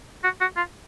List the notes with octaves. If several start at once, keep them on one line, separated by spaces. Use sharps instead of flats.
F#4
F#4
F4